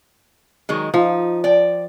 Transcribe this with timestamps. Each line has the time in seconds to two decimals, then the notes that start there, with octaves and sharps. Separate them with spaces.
0.69 D#3 F#3 G#3
0.94 F3 D#4
1.44 D5 G5